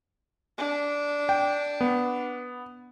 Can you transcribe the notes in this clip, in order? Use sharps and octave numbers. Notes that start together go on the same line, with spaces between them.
D4
G5
B3